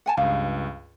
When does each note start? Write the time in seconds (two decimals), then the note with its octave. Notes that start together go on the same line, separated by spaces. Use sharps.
0.06 F#5 G#5 A5
0.17 C#2 G2 F5